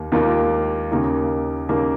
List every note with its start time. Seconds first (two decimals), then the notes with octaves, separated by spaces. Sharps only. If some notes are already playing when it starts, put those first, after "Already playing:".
Already playing: D#2 A#3
0.12 D#2 D#3 A#3 F4 A#4
0.91 D#2 C#3 A#3 D#4 G#4
1.69 D#2 C#3 A#3 D#4 G#4